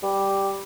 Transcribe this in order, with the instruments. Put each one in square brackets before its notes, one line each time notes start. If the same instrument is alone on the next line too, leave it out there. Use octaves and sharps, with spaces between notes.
[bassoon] G3